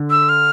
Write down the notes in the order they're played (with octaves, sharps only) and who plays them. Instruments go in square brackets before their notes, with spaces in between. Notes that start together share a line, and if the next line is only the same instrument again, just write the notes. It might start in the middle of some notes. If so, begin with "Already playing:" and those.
Already playing: [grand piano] D3
[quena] E6
F6